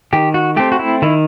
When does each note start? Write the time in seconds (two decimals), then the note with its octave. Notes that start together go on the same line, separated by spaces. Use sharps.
0.13 D#3 G4
0.34 F#4
0.56 A3 C4 G4
0.72 F#4
0.79 E4
1.02 D#3 E4